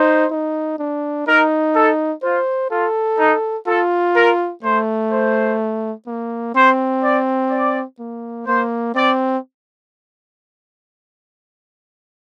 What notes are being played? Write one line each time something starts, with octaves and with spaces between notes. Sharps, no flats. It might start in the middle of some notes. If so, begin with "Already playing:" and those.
Already playing: D#4 C5
D#4
D4
D#4 A#4
A4
F4 C5
F4 A4
D#4
F4 A4
A#4
A3 C5
C5
A#3
C4 C5
D5
D5
A#3
A#3 C5
C4 D5